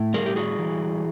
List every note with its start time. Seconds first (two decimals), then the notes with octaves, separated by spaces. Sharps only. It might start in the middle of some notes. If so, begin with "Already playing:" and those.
Already playing: A2
0.14 G3 G#4 A#4
0.26 G4
0.36 F#4 G#4
0.59 E3